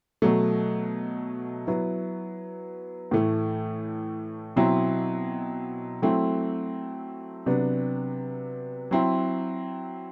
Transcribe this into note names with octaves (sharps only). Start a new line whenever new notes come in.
B2 F#3 A3
F#3 B3 E4
A2 E3 A3
B2 F#3 C4 E4
F#3 A3 C4 E4
C3 F#3 B3 D4
F#3 C4 E4